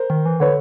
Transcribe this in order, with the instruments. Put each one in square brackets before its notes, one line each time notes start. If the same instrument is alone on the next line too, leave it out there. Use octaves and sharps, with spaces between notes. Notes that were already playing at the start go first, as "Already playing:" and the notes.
Already playing: [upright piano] A#4 C5
[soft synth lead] D#3
E3
[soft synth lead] D3 [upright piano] B4 C#5